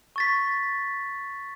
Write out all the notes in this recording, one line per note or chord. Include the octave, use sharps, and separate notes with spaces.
C#6 A6 B6